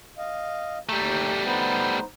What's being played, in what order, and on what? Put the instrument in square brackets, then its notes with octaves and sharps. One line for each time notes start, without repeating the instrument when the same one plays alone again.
[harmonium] D#5 F5
[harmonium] D#2 A#5 [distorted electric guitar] G3 A3 [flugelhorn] G4
[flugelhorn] B3 [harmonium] D#4 C5